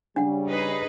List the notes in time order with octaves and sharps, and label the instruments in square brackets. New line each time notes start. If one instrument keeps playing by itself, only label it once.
[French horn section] C#3 G3 [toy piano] D4 F#5
[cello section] D#4 G#4 B4